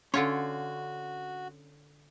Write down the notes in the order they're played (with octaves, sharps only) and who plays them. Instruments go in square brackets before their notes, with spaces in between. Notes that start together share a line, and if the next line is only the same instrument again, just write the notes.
[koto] D3 F4 C#5 [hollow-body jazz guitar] C#4 C6 [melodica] F#4